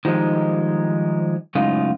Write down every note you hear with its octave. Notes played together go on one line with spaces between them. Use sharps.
D#3 F3 G3 G#3 D#4
F#2 A2 C#3 G#3 D#4 F4